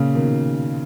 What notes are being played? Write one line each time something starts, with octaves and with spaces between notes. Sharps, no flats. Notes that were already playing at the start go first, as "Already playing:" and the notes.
Already playing: A#2 C#3
B2 D#3